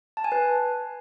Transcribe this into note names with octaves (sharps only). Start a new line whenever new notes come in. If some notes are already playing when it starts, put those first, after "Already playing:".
A5
G#5
B4